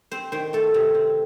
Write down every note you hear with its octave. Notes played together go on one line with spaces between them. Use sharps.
C4 C5
D#3 C5
A3 A4
C3
C4